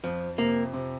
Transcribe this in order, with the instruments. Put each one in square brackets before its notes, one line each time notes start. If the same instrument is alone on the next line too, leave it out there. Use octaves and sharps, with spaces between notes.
[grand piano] F2 [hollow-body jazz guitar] F3
[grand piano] C3 [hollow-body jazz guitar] A#3
[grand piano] C3